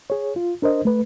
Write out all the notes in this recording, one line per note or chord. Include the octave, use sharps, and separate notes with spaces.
G#4 C#5
F4
D4 A#4 C5 D#5
A3 B4